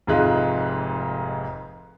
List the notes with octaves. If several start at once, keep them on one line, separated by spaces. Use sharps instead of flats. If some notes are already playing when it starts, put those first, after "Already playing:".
F1 F2 G#2 G#3 F4 F#6